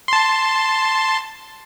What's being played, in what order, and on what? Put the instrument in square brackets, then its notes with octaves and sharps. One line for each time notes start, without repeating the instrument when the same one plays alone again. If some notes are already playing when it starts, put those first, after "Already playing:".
[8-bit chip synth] A5 C6